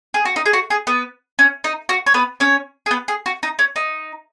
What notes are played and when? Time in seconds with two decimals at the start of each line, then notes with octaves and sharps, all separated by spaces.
0.14 G#4
0.25 F#4
0.36 D#4
0.46 G#4
0.53 F#4
0.70 G#4
0.87 B3 B4
1.39 C#4
1.64 D#4
1.89 F#4
2.06 C#5
2.14 B3 B4
2.40 C#4 C#5
2.86 G#4
2.91 B3 B4
3.08 G#4
3.26 F#4
3.43 D#4
3.59 C#4
3.76 D#4